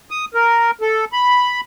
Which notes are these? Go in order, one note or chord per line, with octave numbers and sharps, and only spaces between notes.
D#6
A#4
A4
B5